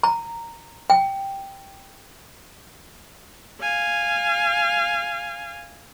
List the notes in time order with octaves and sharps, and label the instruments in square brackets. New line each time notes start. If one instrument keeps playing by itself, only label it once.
[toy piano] A#5
G5
[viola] F5 G#5